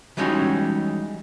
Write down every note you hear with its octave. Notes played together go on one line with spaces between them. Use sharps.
E3 G3 G#3 C#4 D#4 F#4